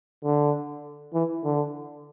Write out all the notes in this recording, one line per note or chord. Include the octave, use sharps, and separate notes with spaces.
D3
E3
D3